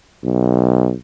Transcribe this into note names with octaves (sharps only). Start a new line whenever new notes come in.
B1